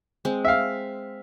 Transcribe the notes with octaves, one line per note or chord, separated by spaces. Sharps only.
G#3 C4
E5 F5